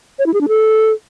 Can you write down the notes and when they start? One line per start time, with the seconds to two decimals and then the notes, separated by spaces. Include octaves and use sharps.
0.19 C#5
0.26 E4
0.34 G#4
0.41 D4
0.48 A4